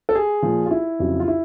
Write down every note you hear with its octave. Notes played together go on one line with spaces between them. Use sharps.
A4
G#4
A#2 F3
F4
E4
F2 C#3 F#3
F4
E4